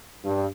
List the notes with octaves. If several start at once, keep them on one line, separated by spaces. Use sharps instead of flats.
G2